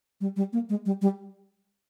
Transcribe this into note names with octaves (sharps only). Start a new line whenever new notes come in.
G3
G3
A#3
G#3
G3
G3